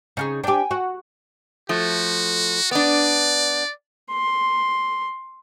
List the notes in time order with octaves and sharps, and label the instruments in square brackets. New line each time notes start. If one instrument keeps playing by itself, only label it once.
[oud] C#3 [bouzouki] D#4 F4 G#4
[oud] D4 G4 [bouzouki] G5 G#5
[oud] F#4
[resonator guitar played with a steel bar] F3 A3 [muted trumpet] F#4
[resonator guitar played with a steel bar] B3 D4 [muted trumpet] D5
[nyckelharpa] C6